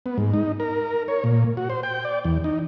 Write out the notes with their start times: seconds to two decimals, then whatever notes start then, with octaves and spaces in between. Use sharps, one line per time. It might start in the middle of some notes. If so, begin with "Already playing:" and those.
0.06 B3
0.18 G#2
0.34 D#4
0.60 A#4
1.08 C#5
1.24 A#2
1.57 F#4
1.70 C5
1.83 G5
2.05 D5
2.24 E2
2.44 D#4